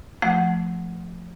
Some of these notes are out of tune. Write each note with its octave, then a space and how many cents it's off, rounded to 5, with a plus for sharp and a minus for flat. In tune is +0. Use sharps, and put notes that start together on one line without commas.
F3 +0 A3 +0 F#5 +0